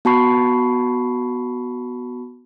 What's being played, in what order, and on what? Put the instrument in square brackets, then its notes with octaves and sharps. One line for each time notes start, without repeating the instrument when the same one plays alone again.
[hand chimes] B3 F#4 A5 B5 C#6 C7